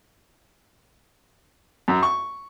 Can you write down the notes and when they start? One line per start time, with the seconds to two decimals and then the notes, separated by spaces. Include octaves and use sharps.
1.88 F#2
2.03 C#6